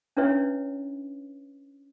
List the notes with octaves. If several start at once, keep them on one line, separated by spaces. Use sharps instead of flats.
C#4 D4 E4 B4 C#5 E5